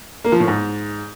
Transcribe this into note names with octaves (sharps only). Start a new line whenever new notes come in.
A#3
F3
A2
G#2